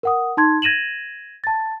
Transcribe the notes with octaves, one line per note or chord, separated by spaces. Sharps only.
A#4 F#5 D#6
D#4 A5 C6 G#6
G#6 A#6 D#7 E7 F#7
A5 A6